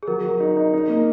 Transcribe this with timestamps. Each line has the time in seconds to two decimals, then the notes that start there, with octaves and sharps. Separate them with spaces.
0.03 G#4
0.07 F#3 A#4
0.24 F#3
0.40 D#4
0.57 D#4
0.74 D#4
0.89 A#3